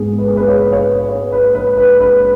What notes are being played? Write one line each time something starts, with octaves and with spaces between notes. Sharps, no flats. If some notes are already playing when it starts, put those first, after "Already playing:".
Already playing: G#2 G#3 B3 G#4
B4
G#4
B4
C#5
C#5
B4
C#5
B4
B4
B4
B4